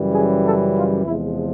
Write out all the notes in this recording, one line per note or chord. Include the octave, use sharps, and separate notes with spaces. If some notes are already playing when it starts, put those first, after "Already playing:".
Already playing: F#2 C#3 E3 G3
G#4
A4
F4
E2 C3 F3 G#3 E4